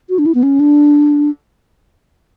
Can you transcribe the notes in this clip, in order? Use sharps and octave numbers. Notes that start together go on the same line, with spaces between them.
F#4
D4
E4
B3
C#4
D4